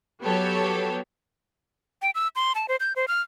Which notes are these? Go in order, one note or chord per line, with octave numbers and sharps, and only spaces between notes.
F#3 B3 G4 A4 C#5
G5
E6
C6
A5
C5
G6
C5
F6